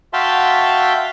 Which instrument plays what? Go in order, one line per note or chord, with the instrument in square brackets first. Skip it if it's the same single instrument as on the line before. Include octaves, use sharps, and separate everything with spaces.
[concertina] F#4 E5 F5 G5 A5 C6